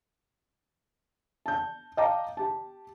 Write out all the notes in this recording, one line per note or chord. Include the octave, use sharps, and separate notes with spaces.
A5 G6
D#5 F5 G5 A5 A#5 D6
G4 A5